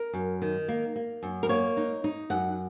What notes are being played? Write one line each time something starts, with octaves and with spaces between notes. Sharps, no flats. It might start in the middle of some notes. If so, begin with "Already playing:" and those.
Already playing: A#4
F#2
D#3
A#3
A#3
F#2
A#4
A#3 C#5
D#4
D#4
F#2 F#5